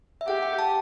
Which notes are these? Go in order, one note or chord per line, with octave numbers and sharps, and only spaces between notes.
E5
G4 F#5
G5
A5